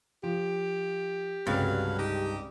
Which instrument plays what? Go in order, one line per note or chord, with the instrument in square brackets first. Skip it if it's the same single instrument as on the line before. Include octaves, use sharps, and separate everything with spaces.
[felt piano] F3 [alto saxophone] G4
[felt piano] C2 C#3 G#3 [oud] G2 [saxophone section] F#3 B4 F5
[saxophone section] D#4 G4